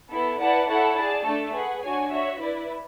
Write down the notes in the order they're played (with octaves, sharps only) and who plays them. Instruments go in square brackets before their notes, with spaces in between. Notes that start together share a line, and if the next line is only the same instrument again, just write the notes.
[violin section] B3 E4 A4
E4 B4 D5 F#5 A5
E4 A4 C#5 F#5
G#4 D5 A5
A3 D4 A4
G#4 B4 F#5
D4 F#4 C#5 G#5
F#4 C#5 E5
E4 B4 D5